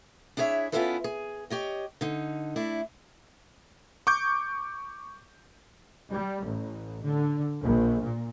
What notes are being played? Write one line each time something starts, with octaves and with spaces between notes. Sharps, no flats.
D4 E4 G#4 C#5 E5
B3 C#4 E4 F4 A4 B4
G#4
G4 C#5 D#5
D3 D#4
A3 D4 E4
C#6 D6 G6
G3
A1
D3
A#1
A#2